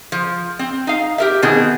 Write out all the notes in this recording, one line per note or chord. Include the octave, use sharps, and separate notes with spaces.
F3
C4
D#4 F5
G4 A#4 E5
B2 D#3 C4 G#4